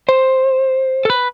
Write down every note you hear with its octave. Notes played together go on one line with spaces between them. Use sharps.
C5
A4
B4